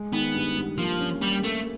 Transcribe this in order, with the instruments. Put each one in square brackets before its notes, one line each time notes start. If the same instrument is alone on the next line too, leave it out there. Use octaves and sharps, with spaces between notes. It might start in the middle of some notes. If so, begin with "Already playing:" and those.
Already playing: [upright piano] G#3
[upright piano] D#3 [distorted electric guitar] B3
[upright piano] G2
G2
[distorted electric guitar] F3 [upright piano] A#3
[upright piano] C#4
[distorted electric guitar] G3 [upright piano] A#3
[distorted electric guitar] A3 [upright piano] A#3